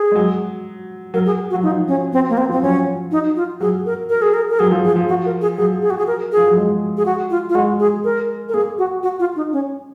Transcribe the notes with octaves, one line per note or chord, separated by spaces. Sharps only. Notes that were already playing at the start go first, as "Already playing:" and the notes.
Already playing: G#4
G#3
F#3
F#3 A#4
G#4
F#4
F#3
F3 D#4
C#4
C4
A#3
C4
F3 C4
F#3 C#4
D#4
F4
F#3 G#4
A#4
A#4
G#4
A#4
A#4
F#3 G#4
F3
G#4
F3
F#4
A#4
G#4
F#3 G#4
G#4
F#4
G#4
A#4
F3 G#4
F#3
G#3
G#4
F#4
F4
F4
G#3 F#4
G#4
A#4
A#4
A#3 G#4
F#4
F#4
F4
D#4
C#4